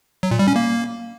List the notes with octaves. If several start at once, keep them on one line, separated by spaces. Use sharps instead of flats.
F#3
A#2
G3
C#4
A#3